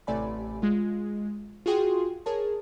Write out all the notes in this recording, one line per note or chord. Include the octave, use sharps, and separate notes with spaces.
A1 C3 A3 D5 G#5 B5
G#3 F4
F4 F#4 G#4 G5 C6
G#4 A#4 C#5 A5